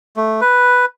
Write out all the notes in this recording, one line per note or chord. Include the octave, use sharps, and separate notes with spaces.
A3
B4